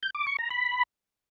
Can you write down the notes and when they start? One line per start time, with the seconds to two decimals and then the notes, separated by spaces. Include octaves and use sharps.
0.03 G6
0.15 D6
0.27 C#6
0.39 A#5
0.50 B5